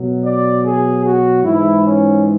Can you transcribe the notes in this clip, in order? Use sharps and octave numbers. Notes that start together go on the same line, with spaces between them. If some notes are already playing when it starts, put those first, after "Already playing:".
Already playing: B2 F#3
D5
G#4
F#4
G#2 E3 G#3 E4
C#4